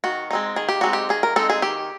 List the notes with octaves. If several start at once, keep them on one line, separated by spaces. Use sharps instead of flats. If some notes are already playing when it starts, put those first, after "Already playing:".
D#3 F#4
G#3 C4 D#4
D#3 G#4
G4
G#3 C4 D#4 F#4
G4
D#3 G#4
A#4
G#3 C4 D#4 A4
G#4
D#3 G4